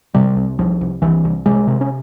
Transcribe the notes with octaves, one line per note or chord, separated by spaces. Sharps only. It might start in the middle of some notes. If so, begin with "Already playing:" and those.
C3 G3
C2
C2 F3
C2
C2 E3
C2
C3 G#3
C3
C#4